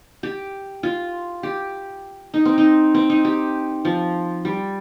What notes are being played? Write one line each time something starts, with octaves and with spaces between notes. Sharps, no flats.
G4
F4
G4
D#4
C4
D#4
C4
D#4
G4
F3
G3